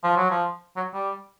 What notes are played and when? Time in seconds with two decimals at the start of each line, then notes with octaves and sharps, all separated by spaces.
0.04 F3
0.17 F#3
0.30 F3
0.76 F#3
0.94 G3